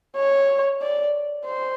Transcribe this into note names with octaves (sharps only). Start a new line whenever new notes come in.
C#5
D5
C5